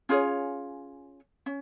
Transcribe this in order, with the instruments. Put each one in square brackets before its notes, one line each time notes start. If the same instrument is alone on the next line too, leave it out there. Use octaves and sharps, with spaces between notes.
[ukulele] C#4 F4 G#4 C#5
C#4